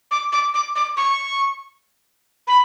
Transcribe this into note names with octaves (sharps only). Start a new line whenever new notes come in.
D6
D6
D6
D6
C#6
B5